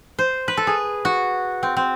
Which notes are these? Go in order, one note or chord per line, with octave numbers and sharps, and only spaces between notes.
C5
B4
A4
G#4
F#4
C4
C4